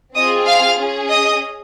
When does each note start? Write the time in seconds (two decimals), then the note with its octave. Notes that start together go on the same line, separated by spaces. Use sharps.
0.15 C4 F4 G#4 D#5 D#6
0.46 F5 F6
0.78 C#4 G#4
1.09 D#5 D#6